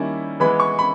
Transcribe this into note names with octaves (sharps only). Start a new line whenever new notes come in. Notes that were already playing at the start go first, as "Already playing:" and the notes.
Already playing: D#3 G3 A#3 C#4 E4
E3 G#3 B3 E4 B5
C#6
B5